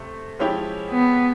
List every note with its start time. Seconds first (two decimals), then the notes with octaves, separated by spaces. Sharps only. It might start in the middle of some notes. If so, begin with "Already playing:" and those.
Already playing: C3 A3
0.39 F3 G#3 C#4 E4 G4
0.91 B3